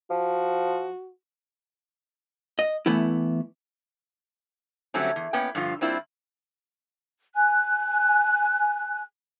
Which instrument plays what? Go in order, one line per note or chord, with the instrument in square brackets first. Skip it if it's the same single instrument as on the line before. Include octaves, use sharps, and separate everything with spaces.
[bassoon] F3 [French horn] F#4
[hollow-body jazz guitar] D#5
E3 A3 B3 E4
[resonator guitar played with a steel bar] D3 F#3 G3 A3 C4 C#4
E2
A#3 B3 C#4 G5
G2 D3 F3 F4
G3 A#3 C4 D4 E4 F4
[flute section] G#5 F#6